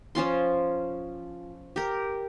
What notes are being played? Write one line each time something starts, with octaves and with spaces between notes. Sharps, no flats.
F3 C#4 F4 C6
G4 A#4